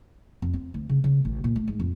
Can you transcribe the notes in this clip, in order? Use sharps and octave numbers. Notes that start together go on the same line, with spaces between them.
F2
C4
D2
C#3
C#3
A1
A#2
A3
G#2
F2